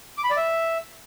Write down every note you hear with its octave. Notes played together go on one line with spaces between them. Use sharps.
D6
B5
D5
E5